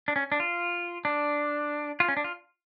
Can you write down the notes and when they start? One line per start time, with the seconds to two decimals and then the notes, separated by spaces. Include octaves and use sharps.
0.08 D4
0.16 C#4
0.32 D4
0.40 F4
1.05 D4
2.00 F4
2.08 C#4
2.17 D4
2.24 F4